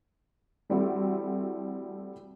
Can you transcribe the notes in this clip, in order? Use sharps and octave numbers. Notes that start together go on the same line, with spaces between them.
E3 G3 A3 C4 E4 F#4